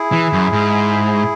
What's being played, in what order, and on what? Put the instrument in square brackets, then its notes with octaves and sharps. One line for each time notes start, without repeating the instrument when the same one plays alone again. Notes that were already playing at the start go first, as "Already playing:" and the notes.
Already playing: [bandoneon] E4 G#4
[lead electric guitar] E3
F#2
G#2